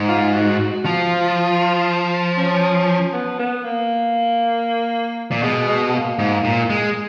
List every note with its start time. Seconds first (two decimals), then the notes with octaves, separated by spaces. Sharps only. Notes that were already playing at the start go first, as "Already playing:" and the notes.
Already playing: G#2
0.08 F4
0.34 F#4
0.60 F#4
0.85 F3 F4
2.37 C#4
3.13 B3
3.39 B3
3.65 A#3
5.31 A#2
5.43 B2 G#3
5.68 G#3
5.93 A#3
6.19 G#2
6.44 A#2
6.70 G#3